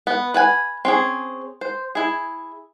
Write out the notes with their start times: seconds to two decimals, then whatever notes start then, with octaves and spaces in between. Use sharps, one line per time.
0.07 B3
0.34 B4 F#5 G#5
0.85 C4 C#4 G#4
1.61 C5
1.95 E4 G#4